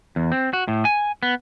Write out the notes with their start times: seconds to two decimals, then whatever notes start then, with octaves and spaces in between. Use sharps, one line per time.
0.16 E2
0.32 C4
0.53 F#4
0.68 A2
0.85 G#5
1.23 B3